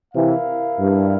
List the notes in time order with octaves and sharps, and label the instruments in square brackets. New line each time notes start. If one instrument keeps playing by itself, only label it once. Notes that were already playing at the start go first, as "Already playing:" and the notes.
[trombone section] C3 E3 [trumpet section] E4 A#4 F5
[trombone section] G2